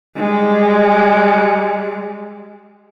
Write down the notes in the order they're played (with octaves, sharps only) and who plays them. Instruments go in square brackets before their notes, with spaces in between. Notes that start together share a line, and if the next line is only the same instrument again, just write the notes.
[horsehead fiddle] G3 G#3